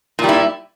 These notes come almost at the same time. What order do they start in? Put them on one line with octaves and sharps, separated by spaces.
A#2 G3 E4